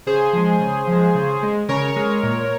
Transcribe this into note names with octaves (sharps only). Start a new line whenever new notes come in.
C#3 G#4 C5
F3 G#3
C#3
F3 G#3
C#3
G#3
C#3 A#4 C#5
G#3
A#2